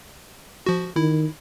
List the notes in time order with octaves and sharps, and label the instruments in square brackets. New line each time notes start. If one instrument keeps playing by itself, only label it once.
[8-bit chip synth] F3 F#4
[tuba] D#3 [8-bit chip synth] E4